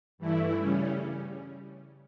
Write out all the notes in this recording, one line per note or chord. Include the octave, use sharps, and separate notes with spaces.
G2 E3 A3 E4
C#3 G3 C#4